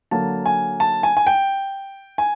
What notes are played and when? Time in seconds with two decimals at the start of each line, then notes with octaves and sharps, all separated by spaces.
0.11 D3 F#3 A#3 A5
0.46 G#5
0.80 A5
1.03 G#5
1.17 G#5
1.27 G5
2.18 G#5